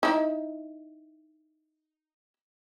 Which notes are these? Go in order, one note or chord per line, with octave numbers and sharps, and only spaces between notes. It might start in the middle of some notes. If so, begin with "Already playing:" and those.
D#4 E4